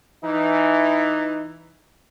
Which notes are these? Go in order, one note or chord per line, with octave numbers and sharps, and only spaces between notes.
E3 D#4